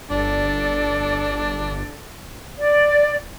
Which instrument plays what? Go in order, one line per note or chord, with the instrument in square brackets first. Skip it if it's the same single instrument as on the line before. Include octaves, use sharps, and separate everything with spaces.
[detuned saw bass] G1 [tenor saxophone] D4 [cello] A4 D5
[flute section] D5